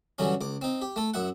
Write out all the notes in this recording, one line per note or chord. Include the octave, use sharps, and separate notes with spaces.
G2 D3 E3 F#3 C#4
C#2 D6
C4 D#4
G4
A3 A4
F#2 E4 F#5